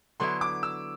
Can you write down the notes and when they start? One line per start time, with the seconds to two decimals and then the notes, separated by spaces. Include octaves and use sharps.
0.20 D3 F#3 B3 E4 C6
0.41 D6
0.63 E6